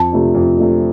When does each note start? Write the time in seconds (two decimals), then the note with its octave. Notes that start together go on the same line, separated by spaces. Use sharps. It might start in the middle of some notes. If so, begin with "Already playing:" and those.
Already playing: F2 A5
0.12 C3 F3 A3 D4
0.35 F2
0.57 C3 F3 A3 D4